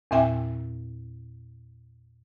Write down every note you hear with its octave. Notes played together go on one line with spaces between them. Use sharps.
E2 A#2 C4 E5 G5 G#5